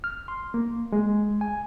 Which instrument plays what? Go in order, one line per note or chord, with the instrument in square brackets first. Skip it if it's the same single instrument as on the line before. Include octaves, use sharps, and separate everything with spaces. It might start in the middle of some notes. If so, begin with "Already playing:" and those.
[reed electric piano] F6
C6
A#3
G#3
G#5